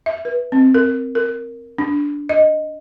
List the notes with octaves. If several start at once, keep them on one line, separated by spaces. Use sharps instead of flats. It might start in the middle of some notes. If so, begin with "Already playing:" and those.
E5
B4
C4
A#4
A#4
D4
D#5